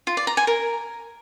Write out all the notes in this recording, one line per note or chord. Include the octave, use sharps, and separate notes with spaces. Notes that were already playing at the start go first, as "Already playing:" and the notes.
F4
D5
A#5
G#5
A#4